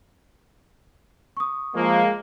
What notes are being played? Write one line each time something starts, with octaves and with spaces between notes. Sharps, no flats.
C#6 D#6
F3 G#3 A#3